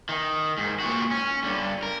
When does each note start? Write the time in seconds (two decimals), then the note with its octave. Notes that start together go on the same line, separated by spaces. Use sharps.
0.09 D#3
0.58 G#2
0.80 A#2 F#4
1.11 C#4
1.44 G2 D3
1.83 A#4